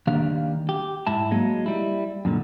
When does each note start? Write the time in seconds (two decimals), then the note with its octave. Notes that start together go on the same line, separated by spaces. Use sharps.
0.07 D#2 D#3 G3 A#3 D4 F5
0.69 G4
1.07 G#2 E4 A5
1.31 F#3 G#3 A#3 D#4
1.66 G3 E4
2.25 F#2 A#2 D3